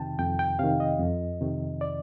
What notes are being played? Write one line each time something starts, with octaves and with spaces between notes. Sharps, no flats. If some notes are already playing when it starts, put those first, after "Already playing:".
Already playing: F2 C3 D#3 G5 A5
F2 G5
G5
C3 D#3 F5
D#5
F2
C3 D#3
D5